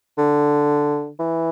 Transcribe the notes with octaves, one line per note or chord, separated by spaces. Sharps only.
D3
E3